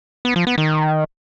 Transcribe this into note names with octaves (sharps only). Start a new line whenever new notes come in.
B3
F3
B3
D#3